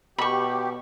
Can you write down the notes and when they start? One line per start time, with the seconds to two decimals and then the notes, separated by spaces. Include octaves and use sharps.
0.18 B2 G4 B5 C#6